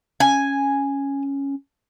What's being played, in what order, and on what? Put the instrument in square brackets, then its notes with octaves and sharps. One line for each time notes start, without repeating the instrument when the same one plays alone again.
[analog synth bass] C#4 [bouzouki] G#5